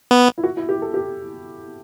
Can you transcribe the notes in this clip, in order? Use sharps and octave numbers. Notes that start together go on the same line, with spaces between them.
B3
E4
F#4
E4
G4
A4
G4